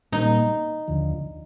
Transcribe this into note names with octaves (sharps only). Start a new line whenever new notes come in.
A#2 G3 A#3 D#4
D#2 D3 F3